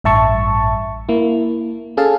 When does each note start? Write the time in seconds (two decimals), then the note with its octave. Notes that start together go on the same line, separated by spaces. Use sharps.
0.04 A1 G2 E5 A5 C#6
1.09 A#3 E4
1.97 C#4 G#4 A4 F5 A5